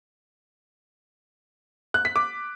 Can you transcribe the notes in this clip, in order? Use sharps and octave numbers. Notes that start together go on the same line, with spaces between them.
F#6
B6
D6